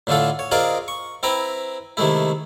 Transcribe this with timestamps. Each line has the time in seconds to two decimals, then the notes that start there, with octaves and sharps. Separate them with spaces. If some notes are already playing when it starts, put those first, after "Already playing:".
0.07 A2 D3 A3 F4 A4
0.39 C#5
0.51 C4 F4 G#4 A#4 D5 D#5
0.88 C#6
1.23 C4 E4 B4 G5 A#5
1.97 C3 D#3 G#3 A3 E4